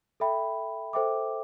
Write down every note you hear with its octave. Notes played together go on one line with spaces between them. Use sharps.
A4 E5 G5 B5
A4 C5 E5 G5 D6